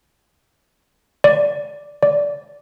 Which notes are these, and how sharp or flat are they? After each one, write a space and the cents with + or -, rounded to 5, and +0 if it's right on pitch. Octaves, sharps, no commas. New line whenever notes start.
D5 -10
D5 -15